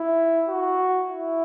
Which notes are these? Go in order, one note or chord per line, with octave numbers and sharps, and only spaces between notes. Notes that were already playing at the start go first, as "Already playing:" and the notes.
Already playing: E4
F#4
E4